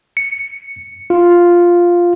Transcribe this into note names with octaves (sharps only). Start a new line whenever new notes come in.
C#7
F4